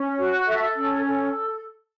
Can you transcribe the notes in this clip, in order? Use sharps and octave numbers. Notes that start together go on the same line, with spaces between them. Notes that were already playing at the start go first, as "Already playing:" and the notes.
Already playing: C#4
F#4
A4 E5
C#4
A4